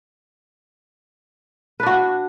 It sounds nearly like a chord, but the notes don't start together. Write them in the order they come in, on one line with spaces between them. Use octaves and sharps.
B4 D4 F#4